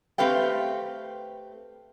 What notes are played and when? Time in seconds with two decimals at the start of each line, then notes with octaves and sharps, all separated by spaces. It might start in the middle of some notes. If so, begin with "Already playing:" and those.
0.18 A3 C4 G4 B4 F5 G5